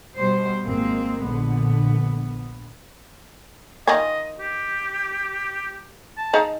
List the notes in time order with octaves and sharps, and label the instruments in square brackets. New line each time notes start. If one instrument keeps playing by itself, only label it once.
[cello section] B2 G3 C5
[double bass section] G#1 A#3 [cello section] G#3 C4
[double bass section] A#1 D3 [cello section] B3
[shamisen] D#3 F4 G#5 [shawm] D#5
[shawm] G4
A5
[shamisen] D#4 G#4 F5